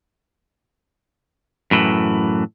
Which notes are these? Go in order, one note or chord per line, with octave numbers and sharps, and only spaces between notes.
F#2 A2 D3 E3